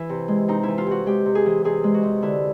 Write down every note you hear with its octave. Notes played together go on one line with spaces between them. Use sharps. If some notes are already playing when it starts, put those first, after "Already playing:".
Already playing: E3 E4
C3
G#3
C3 D#4
E3 E4
F4
C3 F#4
G#3 G4
C3
G#4
E3
C3 G#4
G#3
F#4
C3
D3 E4